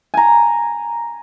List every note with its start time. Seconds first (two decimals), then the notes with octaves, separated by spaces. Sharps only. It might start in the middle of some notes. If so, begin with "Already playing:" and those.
0.14 G#5 A#5